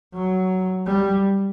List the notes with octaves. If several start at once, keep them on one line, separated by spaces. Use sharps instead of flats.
F#3
G3